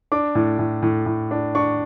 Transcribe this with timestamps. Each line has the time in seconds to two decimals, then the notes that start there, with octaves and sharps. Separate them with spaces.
0.12 D4 D6
0.35 A2
0.59 A2
0.83 A2
1.06 A2
1.31 D4
1.55 D4 C#6